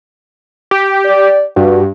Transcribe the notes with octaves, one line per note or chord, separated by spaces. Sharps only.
G4
D5
G2 F#4